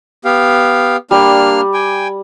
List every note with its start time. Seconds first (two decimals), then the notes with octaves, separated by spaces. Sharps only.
0.25 B3 G4 F5
1.11 G3 A#3 D4 F6
1.74 G5 G#5